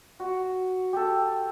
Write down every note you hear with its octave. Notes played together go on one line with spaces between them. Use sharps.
F#4
G4 A4